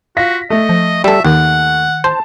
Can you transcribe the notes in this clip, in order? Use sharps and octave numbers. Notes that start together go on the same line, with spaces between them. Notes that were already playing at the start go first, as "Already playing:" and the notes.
F4 F#4 A#6 B6
A3 D#5
F3
G3 A4 E5
D#2 D#3 F#5
C5 A5